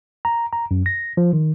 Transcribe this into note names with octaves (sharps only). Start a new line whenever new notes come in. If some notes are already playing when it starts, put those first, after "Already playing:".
A#5
A#5
F#2
A#6
F3
D#3